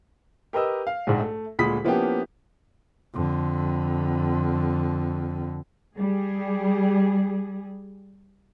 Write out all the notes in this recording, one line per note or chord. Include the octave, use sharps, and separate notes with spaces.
G4 A#4 B4 D#5 E6
F5
A#1 G#2
A3
D2 A#2 G#3 B5 D#6 B6
F3 A#3 B3 C#4 E4 G4
F2 D3
G3 G#4